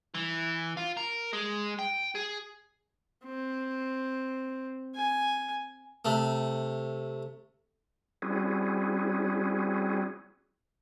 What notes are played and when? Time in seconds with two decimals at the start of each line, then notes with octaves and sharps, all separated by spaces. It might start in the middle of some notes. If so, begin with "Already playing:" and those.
0.15 E3
0.77 F4
0.97 A#4
1.33 G#3
1.79 G5
2.15 G#4
3.25 C4
4.95 G#5
6.05 C3 A3
8.22 G3 C4 C#4 E4 F#4 G#4